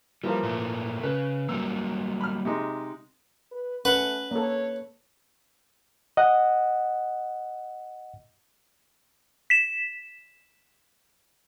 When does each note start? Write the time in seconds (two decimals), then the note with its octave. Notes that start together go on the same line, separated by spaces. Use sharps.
0.24 E3 F3 G3 A#3
0.43 A#2 A3
1.03 C#3 B4
1.49 F#3 G3 A#3 E6
2.21 B5 F6
2.45 C3 G#3 D#4
3.52 B4
3.85 A3 C#4 B4 F#5
4.31 A#3 A4 C#5
6.17 D#5 F#5
9.50 B6 E7